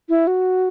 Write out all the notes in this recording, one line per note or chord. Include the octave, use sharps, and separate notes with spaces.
E4
F#4